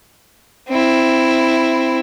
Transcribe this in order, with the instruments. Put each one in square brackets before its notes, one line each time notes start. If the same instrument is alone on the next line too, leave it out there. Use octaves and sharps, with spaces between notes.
[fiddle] C4 E4